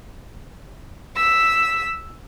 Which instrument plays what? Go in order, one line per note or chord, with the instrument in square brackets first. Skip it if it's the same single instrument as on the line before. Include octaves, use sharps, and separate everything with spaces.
[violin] E6 B6